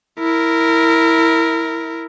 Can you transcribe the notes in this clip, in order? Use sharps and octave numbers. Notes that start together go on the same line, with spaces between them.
E4 A#4